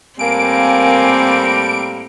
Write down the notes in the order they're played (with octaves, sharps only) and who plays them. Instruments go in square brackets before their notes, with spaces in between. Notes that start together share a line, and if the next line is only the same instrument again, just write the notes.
[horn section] A2 G3 A#3 [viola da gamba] C4 [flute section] A#4 F5 G#5 [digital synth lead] D7